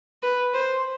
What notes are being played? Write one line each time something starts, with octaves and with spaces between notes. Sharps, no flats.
B4
C5